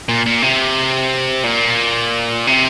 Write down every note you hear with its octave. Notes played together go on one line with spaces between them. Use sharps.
A#2
A#2
C3
A#2
C3